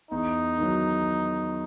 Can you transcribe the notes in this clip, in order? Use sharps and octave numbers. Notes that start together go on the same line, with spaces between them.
E2 D#4
D#3 F#3